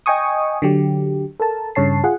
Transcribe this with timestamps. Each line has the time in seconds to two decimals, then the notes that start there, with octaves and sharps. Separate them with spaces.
0.06 D#5 G5 G#5 C#6 D#6
0.62 D3 F#3 G4
1.40 A4 A#4 A5
1.75 G2 C#3 C#5 A5 C7
2.04 F4 G#4 F#5